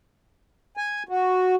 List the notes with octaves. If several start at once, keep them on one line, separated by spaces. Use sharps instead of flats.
G#5
F#4